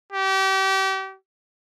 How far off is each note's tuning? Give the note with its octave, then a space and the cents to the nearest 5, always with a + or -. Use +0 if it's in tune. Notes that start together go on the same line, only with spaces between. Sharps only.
G4 -35